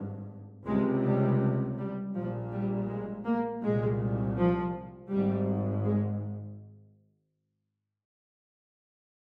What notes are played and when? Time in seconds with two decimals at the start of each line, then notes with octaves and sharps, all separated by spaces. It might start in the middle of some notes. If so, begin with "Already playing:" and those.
Already playing: G#1 G2
0.66 C#2 C3 G#3
1.04 G3
1.78 G3
2.14 A#1 A#2 F3
2.51 G3
2.89 G#3
3.25 A#3
3.62 C2 A#2 G#3
4.37 F3
5.10 G#1 G#2 G3
5.84 G#3